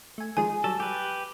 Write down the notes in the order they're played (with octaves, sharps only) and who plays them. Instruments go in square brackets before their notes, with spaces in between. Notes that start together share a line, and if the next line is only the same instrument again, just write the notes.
[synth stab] A3 G#5
[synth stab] D#3 F3 G#3 [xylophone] G#5
[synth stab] F#3 G3 [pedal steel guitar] A4
[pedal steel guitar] G4 B4